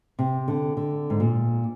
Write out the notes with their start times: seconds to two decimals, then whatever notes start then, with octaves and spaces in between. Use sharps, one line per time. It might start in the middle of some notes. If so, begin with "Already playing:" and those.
0.19 C3
0.48 D3
0.77 D3
1.10 G#2
1.20 A#2